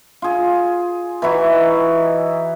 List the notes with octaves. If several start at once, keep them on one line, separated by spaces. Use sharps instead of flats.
F4 G#4
E3 D#4 E4 F#4